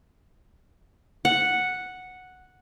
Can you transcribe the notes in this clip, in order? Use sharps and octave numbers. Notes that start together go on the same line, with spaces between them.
F#5